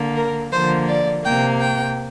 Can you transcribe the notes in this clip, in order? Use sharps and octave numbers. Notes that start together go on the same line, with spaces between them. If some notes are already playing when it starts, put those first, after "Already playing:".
Already playing: D3 A#3
A#4
D3 F3 A#3 C5
D5
C3 A#3 G5
G5